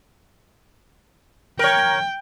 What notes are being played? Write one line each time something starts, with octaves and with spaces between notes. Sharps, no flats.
A#4 C#5 G5